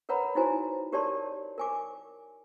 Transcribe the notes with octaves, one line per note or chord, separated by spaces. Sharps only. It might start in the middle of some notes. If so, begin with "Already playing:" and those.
A#4 B4 C#5 F#5 A#5 B5
D#4 E4 F#4 C5 G#5 A#5
G4 A#4 C#5 D5 A5 C6
A#4 G#5 D6